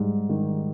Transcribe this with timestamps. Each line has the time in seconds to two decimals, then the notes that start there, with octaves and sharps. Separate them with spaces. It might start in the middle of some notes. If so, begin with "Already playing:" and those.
Already playing: G#2 G3
0.29 D#3